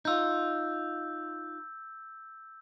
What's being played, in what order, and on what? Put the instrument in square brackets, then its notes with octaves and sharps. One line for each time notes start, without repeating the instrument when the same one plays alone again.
[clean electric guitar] D#4 F4 [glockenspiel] E6 G6